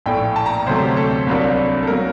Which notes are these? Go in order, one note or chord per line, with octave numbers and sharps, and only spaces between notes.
A#1 A2 A3 G5
A5
A#5
A#5
D2 C3 F#3 A3 C5
G4
A4
C2 C3 F#3 A#3 D4
A4
F#3 A#3 A#4